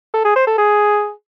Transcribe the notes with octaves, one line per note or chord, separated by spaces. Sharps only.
A4
G#4
C5
A4
G#4